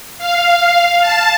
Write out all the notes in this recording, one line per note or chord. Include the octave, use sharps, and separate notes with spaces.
F5
A5